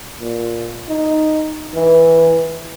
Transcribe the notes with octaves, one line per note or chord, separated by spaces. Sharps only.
A#2
D#4
E3